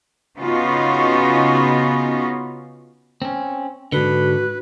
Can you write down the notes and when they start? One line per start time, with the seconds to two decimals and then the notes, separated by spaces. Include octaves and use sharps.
0.37 C#3 B3 C#4 D#4 F4 F#4
3.22 C4 C#4
3.92 G#2 D3 F#4 B4